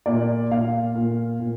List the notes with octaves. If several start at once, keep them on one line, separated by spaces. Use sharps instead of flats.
A#2 D5
A#2 F5
A#2
A#2